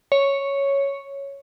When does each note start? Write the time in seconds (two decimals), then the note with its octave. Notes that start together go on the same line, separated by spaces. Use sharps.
0.12 C#5